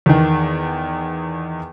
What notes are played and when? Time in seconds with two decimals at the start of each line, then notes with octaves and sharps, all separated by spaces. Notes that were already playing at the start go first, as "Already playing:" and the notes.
0.06 E2 D#3